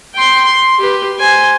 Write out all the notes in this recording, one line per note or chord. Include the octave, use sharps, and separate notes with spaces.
G5 C6
C6
G4 B4
C5 G#5